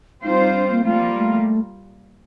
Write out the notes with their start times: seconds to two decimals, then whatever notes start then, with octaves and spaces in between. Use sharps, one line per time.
0.23 G3 C4 D#4 F4 C5
0.39 D#4
0.54 D4
0.70 A#3
0.85 G3 A3 A#3 F4
1.01 F3
1.16 A3